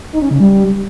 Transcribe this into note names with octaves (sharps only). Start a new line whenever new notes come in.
D#4
C#4
C#3
G3